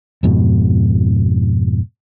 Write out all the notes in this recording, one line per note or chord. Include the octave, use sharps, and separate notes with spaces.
F2 G#2 B2